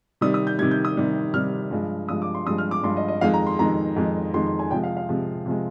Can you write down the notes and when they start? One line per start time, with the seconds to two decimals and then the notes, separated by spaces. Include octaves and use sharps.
0.21 C3 D#3 G3 D#6
0.34 D#6
0.47 G6
0.59 C3 D#3 G3 G#6
0.71 G6
0.85 D#6
0.97 C3 D#3 G3
1.34 C3 D#3 G3 F6
1.71 G2 F3 G#3
2.09 G2 F3 G#3 D#6
2.22 D6
2.34 C6
2.46 G2 F3 G#3 D#6
2.58 F6
2.71 D6
2.83 G2 F3 G#3 C6
2.97 D#5
3.08 D#5
3.21 F2 D#3 G#3 F5
3.34 A#5
3.47 C6
3.59 F2 D#3 G#3 A#5
3.96 F2 D#3 G#3
4.34 F2 D#3 G#3 C6
4.47 C6
4.59 G#5
4.71 C3 F3 G#3 G5
4.83 F5
4.97 F5
5.09 C3 F3 G#3
5.46 C3 F3 G#3